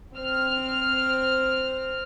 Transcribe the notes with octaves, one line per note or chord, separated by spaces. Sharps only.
C4 F6